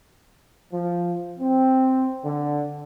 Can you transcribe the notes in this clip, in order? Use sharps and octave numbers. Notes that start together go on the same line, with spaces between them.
F3
C4
D3